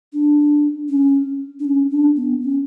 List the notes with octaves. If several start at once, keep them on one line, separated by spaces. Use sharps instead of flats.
D4
C#4
D4
C#4
D4
B3
C#4